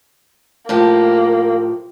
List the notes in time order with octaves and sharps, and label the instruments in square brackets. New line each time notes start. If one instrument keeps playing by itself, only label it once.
[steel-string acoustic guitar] A2 F3 G4 [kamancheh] A#3